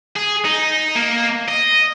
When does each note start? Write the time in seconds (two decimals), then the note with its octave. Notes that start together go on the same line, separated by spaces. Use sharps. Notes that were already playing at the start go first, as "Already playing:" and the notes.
0.16 G#4
0.45 D#4
0.96 A#3
1.48 D#5